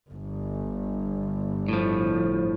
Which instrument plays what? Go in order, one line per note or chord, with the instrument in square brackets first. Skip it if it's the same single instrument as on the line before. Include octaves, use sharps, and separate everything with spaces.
[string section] G1
[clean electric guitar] A2 F3